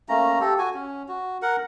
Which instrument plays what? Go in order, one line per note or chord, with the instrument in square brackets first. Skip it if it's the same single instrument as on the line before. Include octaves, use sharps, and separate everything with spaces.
[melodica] A3 A#3 C#4 A#5
G4 A4
F#4 G#5
C#4
F#4
A#4 F#5